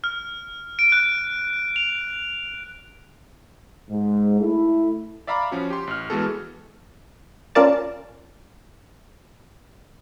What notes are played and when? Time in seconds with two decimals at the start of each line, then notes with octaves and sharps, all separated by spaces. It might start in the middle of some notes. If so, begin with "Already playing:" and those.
0.04 F6
0.79 D7
0.92 F#6
1.76 F7
3.89 G#2
4.39 A3 E4
5.27 D5 E5 F5 A#5 B5 D6
5.51 F3 C#4 F#4
5.70 G4 C6
5.87 A1 F6
6.10 E3 G#3 B3 F#4 G#4 A4
7.55 C#4 F4 A#4 D5 A5